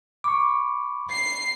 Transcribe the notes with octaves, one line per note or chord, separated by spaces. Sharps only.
B5 C#6 D6
C7